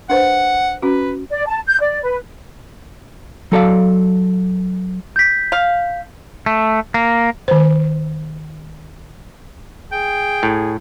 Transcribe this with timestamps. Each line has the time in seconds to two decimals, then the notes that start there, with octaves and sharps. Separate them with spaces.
0.10 D4 B4 C5 F#5
0.82 C#4 F#4 B4
1.30 D5
1.47 A5
1.66 G6
1.80 D5
2.03 B4
3.52 F#3 A4 D5 F5
5.16 G6 B6
5.52 F5
6.46 A3
6.94 A#3
7.48 D#3 C5
9.92 G#4 G5
10.43 A2